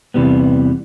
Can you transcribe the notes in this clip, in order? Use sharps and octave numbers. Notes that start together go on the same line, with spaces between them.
E2 C3 E3 G3 B3